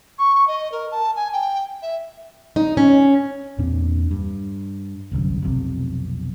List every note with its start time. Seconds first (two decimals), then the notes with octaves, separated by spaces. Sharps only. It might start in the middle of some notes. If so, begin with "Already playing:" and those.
0.19 C#6
0.48 D#5
0.72 A#4
0.91 A5
1.16 G#5
1.33 G5
1.82 E5
2.56 D#4
2.77 C#4
3.58 E2 A#2 C4 D4
4.11 G2
5.12 G1 C2 F#2
5.42 B1 F2 C3